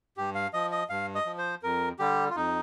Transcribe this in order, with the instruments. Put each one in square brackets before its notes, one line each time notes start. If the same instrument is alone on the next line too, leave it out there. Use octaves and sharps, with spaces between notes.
[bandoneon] G2 G4
F5
F3 D#5
D#5
G2 F5
D#5
F3
C5
F2 A#4
D3 G3 G4
F4
F2 D#4